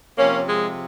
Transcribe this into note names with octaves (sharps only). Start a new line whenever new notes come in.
C3 F3 A#3 C#4
G#3